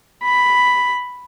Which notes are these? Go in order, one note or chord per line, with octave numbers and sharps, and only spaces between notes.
B5